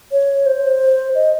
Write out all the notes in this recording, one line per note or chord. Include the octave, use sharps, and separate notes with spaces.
C#5
C5
D#5